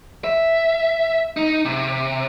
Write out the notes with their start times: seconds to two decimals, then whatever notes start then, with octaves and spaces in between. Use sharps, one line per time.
0.24 E5
1.37 D#4
1.65 C3